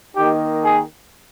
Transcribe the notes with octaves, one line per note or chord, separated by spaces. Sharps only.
D#3 A#3 D#4 G4
G#4